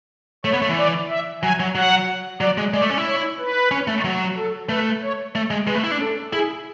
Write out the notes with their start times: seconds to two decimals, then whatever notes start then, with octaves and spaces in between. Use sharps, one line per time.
0.45 A3 C#5
0.53 B3
0.62 A3
0.69 E3
0.78 D5
1.10 E5
1.43 F#3 G#5
1.60 F#3
1.75 F#3 F#5
2.41 F#3 D5
2.58 G#3
2.74 G#3 D5
2.82 A3
2.90 C#4
2.98 E4
3.06 C#5
3.39 B4
3.71 C#4
3.88 A3
4.04 F#3
4.37 A4
4.69 A3 B4
5.02 C#5
5.35 A3
5.51 G#3
5.67 G#3 B4
5.75 A3
5.84 E4
5.91 D4
6.00 A4
6.33 E4 G#4